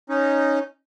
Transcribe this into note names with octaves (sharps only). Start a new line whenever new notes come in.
C#4 D#4